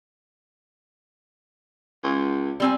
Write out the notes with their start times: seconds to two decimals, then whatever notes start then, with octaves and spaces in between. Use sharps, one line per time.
2.04 C#2
2.60 G3 C4 G#5